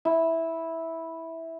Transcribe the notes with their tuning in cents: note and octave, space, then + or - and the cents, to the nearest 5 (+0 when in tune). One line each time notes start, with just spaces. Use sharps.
E4 -10